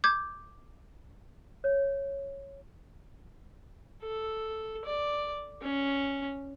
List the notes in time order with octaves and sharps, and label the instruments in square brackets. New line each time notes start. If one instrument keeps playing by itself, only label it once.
[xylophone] D6 G6 G#6
[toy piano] C#5
[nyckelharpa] A4
D5
C#4